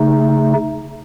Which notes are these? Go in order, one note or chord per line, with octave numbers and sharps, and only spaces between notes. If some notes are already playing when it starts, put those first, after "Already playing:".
Already playing: C#3 A3 D#4